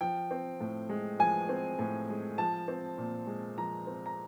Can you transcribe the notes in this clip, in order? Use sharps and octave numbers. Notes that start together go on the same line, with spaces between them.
F3 G5
C4
A2
G#3
F3 G#5
C4
A2
G#3
F3 A5
C4
A#2
G#3
F3 A#5
C4
A#5